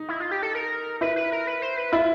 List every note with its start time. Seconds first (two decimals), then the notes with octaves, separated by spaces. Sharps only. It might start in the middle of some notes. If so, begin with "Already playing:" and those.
Already playing: D#4
0.09 E4
0.20 F4
0.31 G4
0.43 A4
0.55 A#4
1.01 E4 B4
1.16 B4
1.32 A#4
1.47 B4
1.62 C5
1.77 B4
1.92 E4 F4